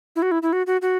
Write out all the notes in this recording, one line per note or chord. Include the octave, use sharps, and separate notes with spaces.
E4
F#4
E4
E4
F#4
F#4
F#4